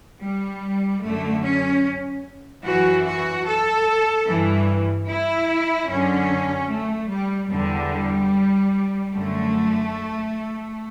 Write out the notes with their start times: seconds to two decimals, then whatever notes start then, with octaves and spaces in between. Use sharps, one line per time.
0.21 G3
1.02 F#2 D3 A3
1.43 C#4
2.65 F#2 E3 F#4
3.05 F#4
3.46 A4
4.27 G2 E3
5.08 E4
5.89 F#2 D3 C#4
6.71 A3
7.11 G3
7.51 E2 D3 G3
9.14 F#2 D3 A3